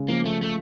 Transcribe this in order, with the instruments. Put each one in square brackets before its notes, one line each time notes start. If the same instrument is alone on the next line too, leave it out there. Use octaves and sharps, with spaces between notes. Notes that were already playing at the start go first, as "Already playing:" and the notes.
Already playing: [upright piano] C#3 G#3
[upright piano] F3 [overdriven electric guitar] A#3
[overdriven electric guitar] A3
A3